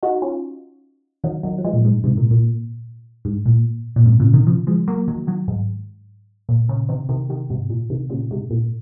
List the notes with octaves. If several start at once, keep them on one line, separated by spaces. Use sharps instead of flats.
D#4 F#4
C#4 F4
D#3 F#3
D#3 F#3
F#3
F3 G#3
A#2
G#2
G#2 C3
A#2
A#2
G#2
A#2
A#2
G#2 C3
A#2 C#3
C3 D#3
C#3 F3
F3 G#3
F#3 A#3
D#3 F#3
D#3 F#3
G#2
A#2
A#2 C#3
C3 D#3
C3 D#3
C3 D#3
G#2 C3
A#2
C3 D#3
A#2 C#3
G#2 C3
A#2